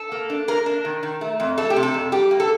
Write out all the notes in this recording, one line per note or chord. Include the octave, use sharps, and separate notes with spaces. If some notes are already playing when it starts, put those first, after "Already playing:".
Already playing: A4
A#3
D4
A#3 A#4
D4
D#3
D#3
A3
F2
A3 A4
G4
C3
A4
F2
G3 G4
A#3
A4